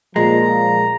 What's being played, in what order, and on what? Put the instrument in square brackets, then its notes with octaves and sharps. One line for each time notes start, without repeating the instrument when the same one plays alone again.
[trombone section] A#2 F3 [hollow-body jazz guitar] G#3 [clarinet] A#5